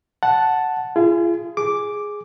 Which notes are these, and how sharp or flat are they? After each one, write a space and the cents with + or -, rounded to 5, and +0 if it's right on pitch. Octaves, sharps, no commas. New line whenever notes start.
F#5 +0 A5 +0
F4 -40 G#4 +0
G#4 +0 D6 +0